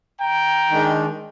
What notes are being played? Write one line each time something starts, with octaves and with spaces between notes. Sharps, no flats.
G5 A#5
D#3 G#3 D4